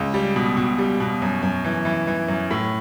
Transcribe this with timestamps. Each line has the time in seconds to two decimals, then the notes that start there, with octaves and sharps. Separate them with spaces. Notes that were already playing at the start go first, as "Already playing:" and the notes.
Already playing: C#2
0.14 G3
0.36 B2
0.57 B2
0.78 G3
1.00 B2
1.22 F#2
1.42 F#2
1.64 E3
1.85 E3
2.07 E3
2.28 F#2
2.51 A2